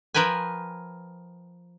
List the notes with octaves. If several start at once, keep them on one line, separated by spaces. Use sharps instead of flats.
F3 A#4 B4 G5 G#5